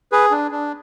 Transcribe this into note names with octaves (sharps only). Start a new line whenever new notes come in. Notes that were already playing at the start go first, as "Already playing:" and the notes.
G#4 B4
D4
D4